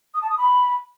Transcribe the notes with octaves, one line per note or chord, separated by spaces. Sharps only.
D#6
A5
D#6
B5